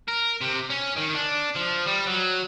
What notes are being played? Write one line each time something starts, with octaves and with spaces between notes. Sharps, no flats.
A#4
C3
C#4
D#3
D4
F3
G3
F#3